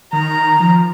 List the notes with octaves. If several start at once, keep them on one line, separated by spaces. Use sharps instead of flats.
D#3 A#5
F3